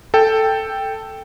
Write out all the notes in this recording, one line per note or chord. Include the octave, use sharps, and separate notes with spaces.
A4 G5